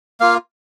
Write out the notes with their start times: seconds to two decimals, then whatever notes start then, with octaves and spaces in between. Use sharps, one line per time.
0.20 A#3 F4 F5